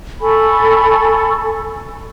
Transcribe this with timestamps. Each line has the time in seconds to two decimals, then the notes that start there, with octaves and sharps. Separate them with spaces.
0.21 A4 G#5 B5 C#6